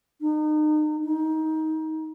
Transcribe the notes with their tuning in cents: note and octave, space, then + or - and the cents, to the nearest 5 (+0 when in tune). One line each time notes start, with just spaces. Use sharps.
D#4 -35
D#4 +20